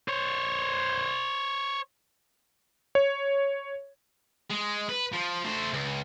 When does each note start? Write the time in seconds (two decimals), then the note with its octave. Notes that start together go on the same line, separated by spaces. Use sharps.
0.08 C5 C#5
2.95 C#5
4.50 G#3
4.89 B4
5.13 F3
5.45 A3 C5
5.74 C#2